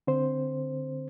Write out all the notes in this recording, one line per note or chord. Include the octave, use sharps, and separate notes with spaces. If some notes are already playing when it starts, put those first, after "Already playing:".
D3 C4 C5